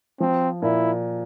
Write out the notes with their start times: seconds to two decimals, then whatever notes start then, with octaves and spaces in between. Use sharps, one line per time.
0.20 F3 C4
0.62 A#2 E4